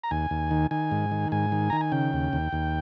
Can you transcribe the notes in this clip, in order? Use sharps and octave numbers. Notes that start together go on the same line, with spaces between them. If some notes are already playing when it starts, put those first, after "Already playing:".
A#5
D#2 G#5
D#2
D#3
D#3 G#5
G#2
D#3
G#2 G#5
D#3
D#3 A#5
G#5
C#3 G5
D#2
D#2
D#2